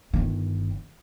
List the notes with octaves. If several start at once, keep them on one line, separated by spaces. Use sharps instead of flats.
G1 D#3